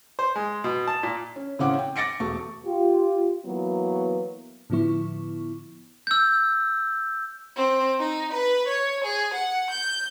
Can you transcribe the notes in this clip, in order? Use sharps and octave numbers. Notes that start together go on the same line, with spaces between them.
C5
G#3
B2
A5
A#2
C#4
A2 C#3 C4 C#4 F#5 D6
G5
D6 A6 A#6 C#7 D7
E1 A3 C#6
F4 G4
E3 F#3 A#3 B3
A2 D3 F3 B3 E4 C#6
E6 G6
C4
D#4
B4
C#5
G#4
F#5
G6